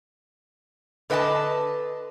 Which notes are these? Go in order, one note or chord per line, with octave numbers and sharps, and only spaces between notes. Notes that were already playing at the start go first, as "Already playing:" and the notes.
D3 B4 D#5 G5 A5